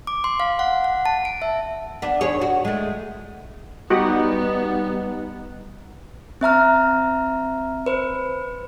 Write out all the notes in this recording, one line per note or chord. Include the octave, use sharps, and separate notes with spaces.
D6
C6
F5
F#5
F#5
A5
D7
E5
B3 D4
D#2 G#4 C#5
F#4
G#3 A3
G3 B3 D#4 F#4 G4 B4 F#5
C4 E5 A#5 F6
B4 C5